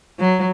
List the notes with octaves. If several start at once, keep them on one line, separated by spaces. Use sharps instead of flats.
F#3